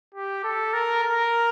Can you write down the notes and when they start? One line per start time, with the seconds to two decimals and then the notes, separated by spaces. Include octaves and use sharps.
0.15 G4
0.44 A4
0.73 A#4
1.03 A#4